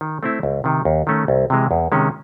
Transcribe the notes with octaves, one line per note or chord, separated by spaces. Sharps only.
D#3
A3 C4 E4
C#2
C3 D#3
D#2
D#3 A3 C#4
C2
C3 E3 G#3
E2
C3 D#3 G#3 C#4